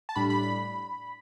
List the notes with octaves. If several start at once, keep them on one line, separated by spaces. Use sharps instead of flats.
A5
A2 G3 D4 B5
B5
B5